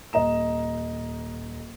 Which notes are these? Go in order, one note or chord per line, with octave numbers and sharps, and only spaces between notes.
D#1 D#5 A#5 E7